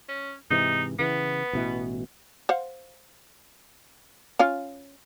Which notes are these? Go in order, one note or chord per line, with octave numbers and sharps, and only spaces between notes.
C#4
G#2 C3 E3 D#4
C#3 E3 B3
A1 B2 E3
C5 F5 F#5
C#4 F4 F5